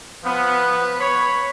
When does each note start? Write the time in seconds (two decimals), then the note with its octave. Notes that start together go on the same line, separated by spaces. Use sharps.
0.25 F3 B3 B4
1.00 C#5 B5